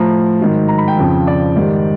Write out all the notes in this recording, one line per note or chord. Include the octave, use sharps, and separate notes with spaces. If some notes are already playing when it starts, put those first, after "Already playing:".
Already playing: A2 F3 A#5
G#2 D#3 F#3
A#5
B5
G5
F2 C#3 F3
D5
G#2 D#3 G3